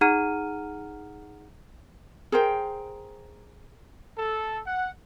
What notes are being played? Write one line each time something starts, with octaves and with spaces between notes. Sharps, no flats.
D#4 G#4 F#5 A#5 F6 D#7
G#4 A#4 C5 G5
A4
F#5